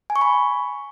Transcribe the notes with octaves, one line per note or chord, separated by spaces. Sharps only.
G#5
C#6
B5